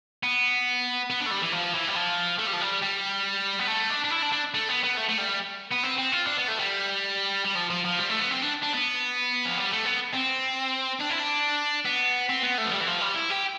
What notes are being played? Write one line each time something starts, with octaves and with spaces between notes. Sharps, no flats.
B3
B3
D4
A3
G3
E3
F3
E3
G3
F3
A3
G3
F3
G3
G3
B3
A3
D4
D4
E4
D4
D4
A3
B3
B3
A3
A3
G3
B3
C4
C4
F4
D4
B3
A3
G3
G3
F3
F3
F3
G3
A3
B3
C4
D4
D4
B3
F3
G3
A3
B3
C4
D4
E4
D4
B3
C4
B3
A3
F3
G3
E3
F3
G3
E4
G4